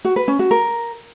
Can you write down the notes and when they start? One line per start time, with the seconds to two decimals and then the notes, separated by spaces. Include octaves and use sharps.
0.05 F#4
0.16 B4
0.28 C#4
0.39 F#4
0.51 A#4